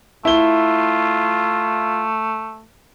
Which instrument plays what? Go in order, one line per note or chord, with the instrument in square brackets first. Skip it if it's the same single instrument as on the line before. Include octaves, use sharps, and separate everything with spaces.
[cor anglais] A3 [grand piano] E4 G7 [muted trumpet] F4